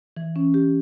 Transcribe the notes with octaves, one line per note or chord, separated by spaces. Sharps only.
E3
C#4
G4